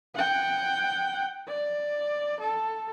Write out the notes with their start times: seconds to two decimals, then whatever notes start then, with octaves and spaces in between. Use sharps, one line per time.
0.15 F#5 G5
1.48 D5
2.40 A4